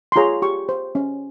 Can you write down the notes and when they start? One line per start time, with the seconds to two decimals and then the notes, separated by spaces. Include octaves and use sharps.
0.12 C6
0.16 F4 G#4 C#5 A#5
0.42 G4 C#6
0.69 C5
0.95 C#4